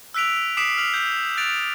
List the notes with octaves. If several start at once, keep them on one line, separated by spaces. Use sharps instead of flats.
E6 F#6 B6 D7 F7
D6 D#6 B6 C7 D7 E7
F6 F7 F#7
G6
F#6 A6 D7 F7